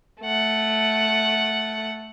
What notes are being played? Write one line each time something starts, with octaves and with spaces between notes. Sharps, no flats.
A3 F#5